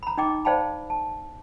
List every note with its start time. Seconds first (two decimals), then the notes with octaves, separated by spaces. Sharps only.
0.03 A#5 B5
0.18 D#4 D#5 G5 D6
0.45 C5 D5 F5 G5 A5 B5
0.90 A5